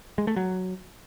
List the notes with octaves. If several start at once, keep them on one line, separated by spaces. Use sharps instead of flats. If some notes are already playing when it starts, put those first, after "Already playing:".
G#3
A3
F#3